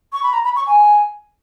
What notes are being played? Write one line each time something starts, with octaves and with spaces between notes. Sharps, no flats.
C#6
B5
A#5
B5
C#6
G#5